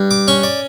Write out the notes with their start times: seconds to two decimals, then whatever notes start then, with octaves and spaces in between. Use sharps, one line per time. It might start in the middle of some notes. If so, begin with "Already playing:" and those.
Already playing: G2
0.11 D6
0.28 C#4 C#6
0.43 D5